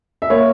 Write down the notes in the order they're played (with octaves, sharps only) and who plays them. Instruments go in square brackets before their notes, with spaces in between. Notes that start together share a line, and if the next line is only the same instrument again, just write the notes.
[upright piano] E5
A#3 C#5